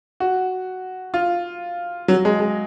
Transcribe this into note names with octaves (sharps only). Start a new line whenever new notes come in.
F#4
F4
F#3
G#3
G#3